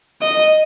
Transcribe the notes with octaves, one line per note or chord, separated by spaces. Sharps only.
D#5